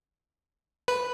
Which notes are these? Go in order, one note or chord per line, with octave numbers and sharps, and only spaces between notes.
B4